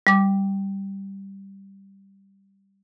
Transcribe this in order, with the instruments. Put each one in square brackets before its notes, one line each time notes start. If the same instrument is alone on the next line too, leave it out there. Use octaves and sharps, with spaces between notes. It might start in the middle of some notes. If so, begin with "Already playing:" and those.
[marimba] G3 D6